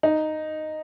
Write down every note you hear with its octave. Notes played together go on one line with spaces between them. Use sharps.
D#4